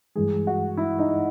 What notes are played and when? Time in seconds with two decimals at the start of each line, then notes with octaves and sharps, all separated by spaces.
0.16 G2 E3 G#3 G#4
0.47 F#4
0.77 E4
0.99 D#4